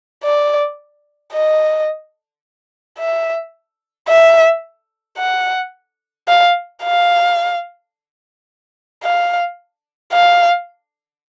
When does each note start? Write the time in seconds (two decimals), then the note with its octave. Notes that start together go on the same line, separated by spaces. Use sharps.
0.24 D5
1.33 D#5
2.99 E5
4.08 E5
5.18 F#5
6.28 F5
6.84 F5
9.03 F5
10.13 F5